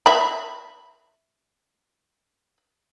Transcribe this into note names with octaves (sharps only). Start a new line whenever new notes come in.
E5 B5